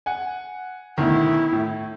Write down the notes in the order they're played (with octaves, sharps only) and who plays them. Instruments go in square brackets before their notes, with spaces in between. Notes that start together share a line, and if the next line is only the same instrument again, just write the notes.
[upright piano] F#5 G#5
[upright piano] D2 B2 D#3 [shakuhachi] E4
[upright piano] A2